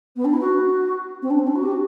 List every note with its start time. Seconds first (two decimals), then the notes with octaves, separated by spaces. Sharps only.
0.16 B3
0.24 D4
0.33 E4
0.40 F#4
1.22 C4
1.30 D4
1.38 C4
1.46 D4
1.55 F#4
1.62 G4
1.71 F#4